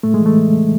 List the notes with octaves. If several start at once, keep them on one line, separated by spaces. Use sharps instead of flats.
A2 A3
G#3
E3
A3